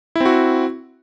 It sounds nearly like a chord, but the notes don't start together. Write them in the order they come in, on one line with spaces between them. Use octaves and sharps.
E4 C4 F#4